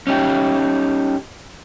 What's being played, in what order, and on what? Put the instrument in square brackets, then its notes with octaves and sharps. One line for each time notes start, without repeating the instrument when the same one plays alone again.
[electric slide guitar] C#4 D#4 G4